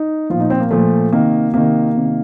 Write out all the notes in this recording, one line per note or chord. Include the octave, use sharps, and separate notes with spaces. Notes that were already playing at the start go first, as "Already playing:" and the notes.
Already playing: D#4
A#2 F3 F4
D#4
C4
A#3
A#2 F3 A3
C3 D#3 A#3
C3 D#3 A#3
C3 D#3